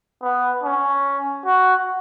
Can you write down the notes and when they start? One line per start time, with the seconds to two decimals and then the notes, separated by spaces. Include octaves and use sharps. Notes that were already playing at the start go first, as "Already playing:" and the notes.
0.22 B3
0.63 C#4
1.45 F#4